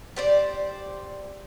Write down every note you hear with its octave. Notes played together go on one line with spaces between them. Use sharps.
G4 C5 D5